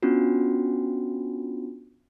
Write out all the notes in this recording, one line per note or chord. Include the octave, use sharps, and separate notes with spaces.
B3 C#4 D4 F4 F#4